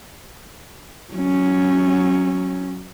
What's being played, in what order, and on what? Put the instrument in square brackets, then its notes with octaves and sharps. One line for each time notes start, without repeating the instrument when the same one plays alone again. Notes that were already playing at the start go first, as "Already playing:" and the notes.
[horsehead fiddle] F#3 C#4